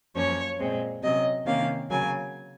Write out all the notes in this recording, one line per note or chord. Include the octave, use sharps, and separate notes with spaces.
F#2 F3 A#3 C#4 C#5
A#2 G#3 C4
C3 F#3 C#4 D#5
C3 D#3 A#3 C#4 F5
C#3 F#3 A#3 G#5